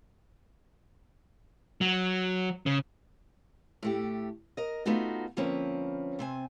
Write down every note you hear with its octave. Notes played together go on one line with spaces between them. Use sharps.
F#3
C#3
A2 A3 G4
A#4 D#5
A3 B3 D#4 F4 F#4
D3 F3 A#3 C4 C#4 B4
C3 C4 G#5